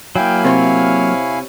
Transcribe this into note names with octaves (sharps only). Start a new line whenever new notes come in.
F#3 A#3 E4 F5 G5 G#5
C3 C4 C#5